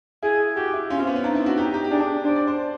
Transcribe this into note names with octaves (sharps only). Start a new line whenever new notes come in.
E4 G#4
F#4 G4
E4
C#4 F4
C4
B3
C#4
D4 D#4
E4
F#4
D#4 G4
G4
G4
D4 G#4
D4 C5
D5
C5